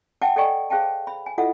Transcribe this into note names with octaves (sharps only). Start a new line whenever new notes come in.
E5 F#5 G5 A5 D6
A4 D5 D#5 G5 G#5 C#6
G#4 C5 F5 G5 A5
B5
G#5
E4 F4 A4 D#5 E5 F#5